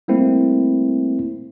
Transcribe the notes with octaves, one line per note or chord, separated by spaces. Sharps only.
G3 A3 A#3 C4 E4